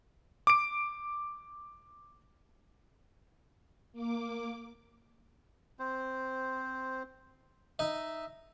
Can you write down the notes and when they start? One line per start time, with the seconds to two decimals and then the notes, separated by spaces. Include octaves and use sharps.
0.47 D6 D7
3.93 A#3 D6
5.79 C4 C5
7.79 D#4 D#5 E5